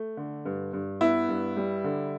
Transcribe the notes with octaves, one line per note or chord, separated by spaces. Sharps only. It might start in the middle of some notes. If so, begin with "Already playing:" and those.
Already playing: A3
D3
G2
G2
B3 E4
G2
G3
D3